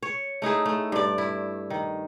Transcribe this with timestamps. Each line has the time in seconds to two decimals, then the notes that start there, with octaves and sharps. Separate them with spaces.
0.03 C#5
0.42 A3 D#4 E4 G#4
0.65 A3
0.92 G2 D5
1.18 E4
1.70 D#3